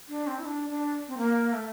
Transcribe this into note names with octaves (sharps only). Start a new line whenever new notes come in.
D4
C4
E4
D4
D4
C4
A#3
A3